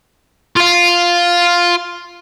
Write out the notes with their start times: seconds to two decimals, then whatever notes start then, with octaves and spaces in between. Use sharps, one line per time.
0.57 F4 F5